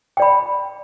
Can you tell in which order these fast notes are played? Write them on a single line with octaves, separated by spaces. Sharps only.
G5 D5 B5